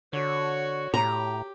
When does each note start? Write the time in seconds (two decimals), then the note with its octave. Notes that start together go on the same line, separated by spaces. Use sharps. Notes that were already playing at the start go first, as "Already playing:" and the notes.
0.13 D3 F#4 C#5
0.94 A2 G4 A#5